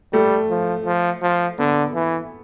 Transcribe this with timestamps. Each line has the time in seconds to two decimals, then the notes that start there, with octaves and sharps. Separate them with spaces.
0.13 G3 A3
0.50 F3
0.85 F3
1.22 F3
1.58 D3 B3
1.94 E3